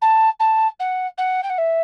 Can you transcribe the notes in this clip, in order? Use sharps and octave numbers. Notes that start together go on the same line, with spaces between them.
A5
A5
F#5
F#5
G5
F#5
E5